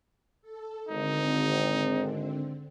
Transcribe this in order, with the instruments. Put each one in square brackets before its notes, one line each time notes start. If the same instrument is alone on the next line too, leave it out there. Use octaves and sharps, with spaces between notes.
[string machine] A4
[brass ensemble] G#1 [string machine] D3 C4 [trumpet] D#4